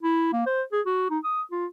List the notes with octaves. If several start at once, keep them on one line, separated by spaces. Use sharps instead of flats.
E4
A#3
C5
G#4
F#4
D#4
D#6
F4